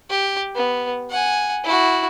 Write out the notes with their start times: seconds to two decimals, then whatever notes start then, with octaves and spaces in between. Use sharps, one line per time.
0.10 G4
0.55 B3
1.10 F#5 G#5
1.64 E4 F#4